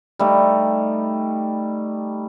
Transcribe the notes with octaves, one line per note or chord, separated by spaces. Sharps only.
G3 A3 D#4